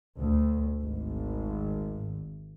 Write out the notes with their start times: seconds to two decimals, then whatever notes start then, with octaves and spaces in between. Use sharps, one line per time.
0.20 D2
0.82 G#1